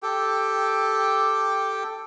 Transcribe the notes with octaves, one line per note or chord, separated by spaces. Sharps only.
G4 A4 G5